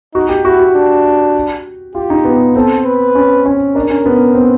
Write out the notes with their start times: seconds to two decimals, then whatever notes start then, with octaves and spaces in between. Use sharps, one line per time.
0.14 D#4 F#4
0.29 G4
0.45 E4 F#4
0.60 F#4
0.75 D4
1.95 F4 G4
2.10 D#4
2.25 B3
2.56 C4 A4
2.85 B4
3.15 C#4
3.46 C#4
3.75 D4 A#4
3.90 C#4
4.06 B3
4.35 C4